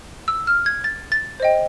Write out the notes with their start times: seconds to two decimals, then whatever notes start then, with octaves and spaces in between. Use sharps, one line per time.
0.28 E6
0.47 F6
0.66 G#6
0.84 A6
1.12 A6
1.40 C5 D#5 G5